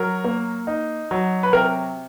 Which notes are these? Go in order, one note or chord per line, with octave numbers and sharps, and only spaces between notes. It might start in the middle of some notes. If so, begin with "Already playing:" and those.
Already playing: F#3 A#4
A#3
D#4
F#3
B4
C3 A#4